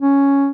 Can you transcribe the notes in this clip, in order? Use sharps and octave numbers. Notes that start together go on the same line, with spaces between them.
C#4